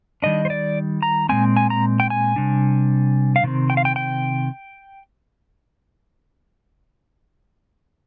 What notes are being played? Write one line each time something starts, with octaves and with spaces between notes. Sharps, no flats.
D#3 G3 D4 D#5
C5
D5
A#5
A#2 G#3 C4 G#5
G#5
A#5
G5
G#5
C3 G3 D4
F5
C3 D#3 C4
G5
F5
G5
G5